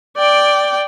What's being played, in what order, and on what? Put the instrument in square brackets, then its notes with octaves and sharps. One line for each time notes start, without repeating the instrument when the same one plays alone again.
[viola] D5 G5